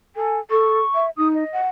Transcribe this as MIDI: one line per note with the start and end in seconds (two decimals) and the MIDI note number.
0.16 0.40 69
0.16 0.38 80
0.51 0.80 69
0.51 1.05 85
0.95 1.10 76
1.18 1.44 63
1.18 1.28 87
1.35 1.61 75
1.53 1.68 78